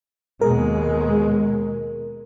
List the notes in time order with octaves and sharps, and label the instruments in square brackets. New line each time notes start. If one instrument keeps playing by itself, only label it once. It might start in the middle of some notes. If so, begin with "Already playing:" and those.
[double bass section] D#2 B2 G#3 [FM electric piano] A#4